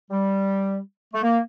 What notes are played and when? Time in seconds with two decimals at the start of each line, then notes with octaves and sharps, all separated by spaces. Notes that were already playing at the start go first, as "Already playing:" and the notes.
0.11 G3
1.14 A3
1.22 A#3